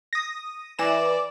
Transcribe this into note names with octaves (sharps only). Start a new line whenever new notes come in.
D#6 A#6
E3 D5 A#6 E7